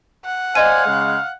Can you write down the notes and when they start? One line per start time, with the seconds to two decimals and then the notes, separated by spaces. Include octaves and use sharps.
0.25 F#5
0.55 C5 D5 D#5 F5 G#5 D#7
0.86 C#3 G#3